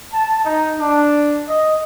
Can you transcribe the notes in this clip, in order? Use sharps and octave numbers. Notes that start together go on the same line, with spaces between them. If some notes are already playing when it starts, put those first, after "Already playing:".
A5
D#4
D4
D#5